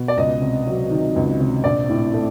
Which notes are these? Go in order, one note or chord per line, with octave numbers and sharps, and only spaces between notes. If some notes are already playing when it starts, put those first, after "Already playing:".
Already playing: B2
D5
C#2 D#5
C3
F#3
D#3
C#2
C3
A#1 D5
A2
A3